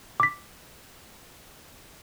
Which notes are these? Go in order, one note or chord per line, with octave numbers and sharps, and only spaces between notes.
D6 B6